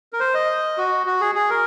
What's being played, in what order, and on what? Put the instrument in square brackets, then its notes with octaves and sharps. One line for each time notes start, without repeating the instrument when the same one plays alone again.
[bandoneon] A#4
C5
D#5
F#4
F#4
G#4
G#4
A#4